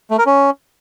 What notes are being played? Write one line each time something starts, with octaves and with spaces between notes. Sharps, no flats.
A3
A#4
C#4